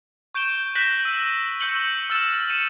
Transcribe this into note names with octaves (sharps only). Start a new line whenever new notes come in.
C#6 G6 D7 E7 G7
F#6 G6 A#6 B6 E7 F#7
E6 D#7
C#6 E6 G6 C#7 F#7 G7
E6 F6 A6 E7
C#7 D#7 E7